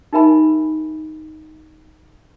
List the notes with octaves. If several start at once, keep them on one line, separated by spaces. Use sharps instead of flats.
D#4 G4 A#4 E5 G#5 B5